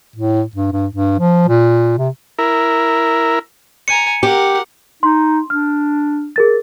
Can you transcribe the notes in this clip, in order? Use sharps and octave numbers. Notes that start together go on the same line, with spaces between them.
A2
G2
G2
G2
F3
A#2
C3
E4 A#4
G#5 A#5 C#7
G4 A#4 F#5
D#4 C6
D4 F6
G#4 A#4 A6